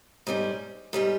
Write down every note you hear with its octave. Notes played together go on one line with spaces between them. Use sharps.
G#2 G3 C#4
G#2 G3 C#4